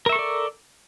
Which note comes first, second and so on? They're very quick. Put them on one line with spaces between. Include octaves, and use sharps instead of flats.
A#4 E5 C#6 A4 D5